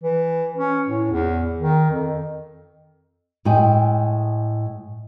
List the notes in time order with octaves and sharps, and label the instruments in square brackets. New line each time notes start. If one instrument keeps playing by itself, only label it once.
[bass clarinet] E3
C#4
A2
E2
D#3
F2
[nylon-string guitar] A2 G#3 A3 G5 G#5